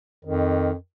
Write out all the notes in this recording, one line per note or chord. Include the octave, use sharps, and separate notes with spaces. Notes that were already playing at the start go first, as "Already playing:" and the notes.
F2 D#3